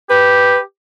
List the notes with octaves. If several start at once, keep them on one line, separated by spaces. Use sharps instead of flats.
G4 B4